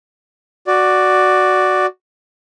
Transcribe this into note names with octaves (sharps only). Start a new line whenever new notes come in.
F#4 D5